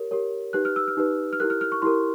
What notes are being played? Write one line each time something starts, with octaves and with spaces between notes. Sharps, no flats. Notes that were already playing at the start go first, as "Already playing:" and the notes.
Already playing: G4 A#4 C#5
G4 A#4 C#5
D#4 G4 B4 F#6
F6
E6
F6
D#4 G4 B4
F6
E4 G4 A#4 F#6
F6
F6
C#6
E4 G4 A#4 C6